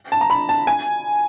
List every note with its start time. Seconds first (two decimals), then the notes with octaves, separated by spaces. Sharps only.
0.12 A5
0.21 A#5
0.30 B5
0.49 A5
0.67 G#5